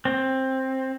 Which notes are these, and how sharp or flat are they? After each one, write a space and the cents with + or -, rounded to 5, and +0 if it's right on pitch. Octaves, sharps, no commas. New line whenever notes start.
C4 +15